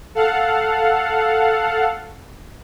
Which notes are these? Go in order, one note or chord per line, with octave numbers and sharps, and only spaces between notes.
A4 F5 F#5